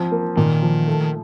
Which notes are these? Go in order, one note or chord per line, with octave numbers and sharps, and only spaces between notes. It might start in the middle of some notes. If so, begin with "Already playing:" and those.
Already playing: F3 C4
A#3
A#2 D#3
F3
A3